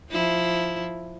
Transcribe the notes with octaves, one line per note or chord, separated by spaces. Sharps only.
F3 E4